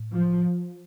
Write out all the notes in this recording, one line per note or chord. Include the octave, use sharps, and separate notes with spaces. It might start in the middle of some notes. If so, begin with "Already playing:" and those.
Already playing: A2
F3